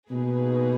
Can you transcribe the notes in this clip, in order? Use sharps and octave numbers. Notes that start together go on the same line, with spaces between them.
B2 A#3 D#4 G#4 B4